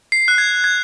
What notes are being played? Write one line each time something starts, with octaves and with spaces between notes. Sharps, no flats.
C7
F#6
G#6
G#6